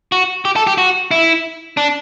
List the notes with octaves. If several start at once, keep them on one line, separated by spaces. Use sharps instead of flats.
F#4
G4
A4
G4
F#4
E4
D4